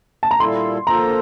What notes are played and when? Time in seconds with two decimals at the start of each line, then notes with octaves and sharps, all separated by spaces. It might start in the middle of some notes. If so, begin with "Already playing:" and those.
0.23 A5
0.31 A#5
0.40 A#2 G3 A#3 E4 A4 C6
0.87 A#3 F4 A4 C5 A#5